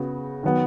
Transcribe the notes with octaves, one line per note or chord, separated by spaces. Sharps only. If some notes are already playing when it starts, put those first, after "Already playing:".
Already playing: C#3 B3 F#4
D#3 F#3 B3